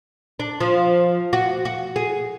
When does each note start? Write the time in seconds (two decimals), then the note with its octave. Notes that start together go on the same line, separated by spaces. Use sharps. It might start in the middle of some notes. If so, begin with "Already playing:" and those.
0.40 D4
0.60 F3
1.33 F#4
1.65 F#4
1.96 G#4